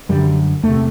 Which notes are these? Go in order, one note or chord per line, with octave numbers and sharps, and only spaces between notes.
F#2 D3 G3
E2 C3 A3